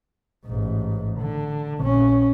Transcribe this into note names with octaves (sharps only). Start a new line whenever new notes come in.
A1 G#2
D3
A#1 C#4